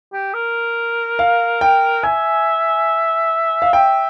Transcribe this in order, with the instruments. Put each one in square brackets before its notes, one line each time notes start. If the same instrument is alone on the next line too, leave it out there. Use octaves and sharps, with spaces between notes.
[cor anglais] G4
A#4
[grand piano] F5
G5
[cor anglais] E5 [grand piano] G#5
[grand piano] F5
[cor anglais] E5 [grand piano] G5